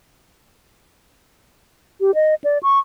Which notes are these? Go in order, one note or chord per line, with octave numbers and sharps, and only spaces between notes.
G4
D#5
D5
C#6